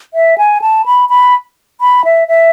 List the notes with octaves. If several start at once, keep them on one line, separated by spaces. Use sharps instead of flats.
E5
G#5
A5
B5
B5
B5
E5
E5